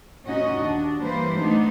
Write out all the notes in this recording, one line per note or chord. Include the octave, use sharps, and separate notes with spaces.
A#2 C#4 D#4 F#4 D#5
D#2 D4
E3 G3 A#3 B4 C5
A3 B3 D4 D#4